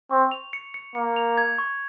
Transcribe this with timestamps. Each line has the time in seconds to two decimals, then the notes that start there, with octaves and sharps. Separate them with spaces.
0.11 C4 C#6
0.31 F7
0.53 C#7
0.74 C#7
0.95 A#3 C#7
1.16 F7
1.37 G#6
1.58 C#6